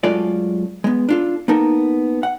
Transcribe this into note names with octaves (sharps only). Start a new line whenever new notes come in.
F#2 G#3 A3 F4 A4 D5
G#3 B3
D4 F4 A4
A#3 B3 D#4 A4 A#4
F#5